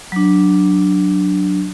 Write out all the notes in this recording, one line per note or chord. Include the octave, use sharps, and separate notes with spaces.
F#3 D4